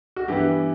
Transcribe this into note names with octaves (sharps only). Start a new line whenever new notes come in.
F#4
G2 E3 B3 G4